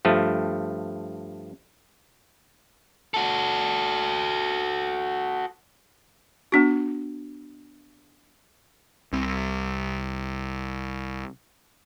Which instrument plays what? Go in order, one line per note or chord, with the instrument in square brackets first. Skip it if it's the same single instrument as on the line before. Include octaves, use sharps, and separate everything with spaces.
[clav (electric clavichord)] G2 F3 A3
[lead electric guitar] F#4 A4
[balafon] B3 D4 F#4
[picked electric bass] C2 C3